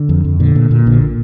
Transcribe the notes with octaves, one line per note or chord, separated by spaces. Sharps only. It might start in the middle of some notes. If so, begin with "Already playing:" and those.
Already playing: D3
F2
F2
A#2 D3
A#2
A#2
A#1 D3
A#2